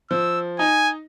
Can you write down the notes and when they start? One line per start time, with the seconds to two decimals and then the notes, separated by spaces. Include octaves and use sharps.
0.11 F3 E6
0.59 D#4 G#5